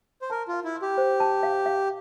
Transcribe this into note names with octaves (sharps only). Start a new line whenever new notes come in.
C5
A#4 A5
F4
F5
E4
C6
G4
C5
A5
F5
F5